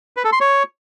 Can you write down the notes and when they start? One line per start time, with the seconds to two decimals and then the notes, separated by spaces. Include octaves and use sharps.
0.17 B4
0.25 A4
0.32 C6
0.40 C#5